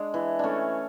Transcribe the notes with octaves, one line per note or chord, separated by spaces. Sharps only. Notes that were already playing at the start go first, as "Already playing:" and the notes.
Already playing: G#3 D4
E3
A3 C#4 D4